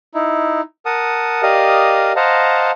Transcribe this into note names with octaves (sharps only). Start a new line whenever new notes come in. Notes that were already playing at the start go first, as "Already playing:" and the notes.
D#4 E4
A#4 F#5 A5 D#6
G4 A#4 D5 D#5 F5 D#6
C5 D#5 F5 F#5 A5 A#5